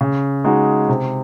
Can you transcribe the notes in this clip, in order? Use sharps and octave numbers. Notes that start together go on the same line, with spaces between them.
C#3
G#3 D#4 F#4
C3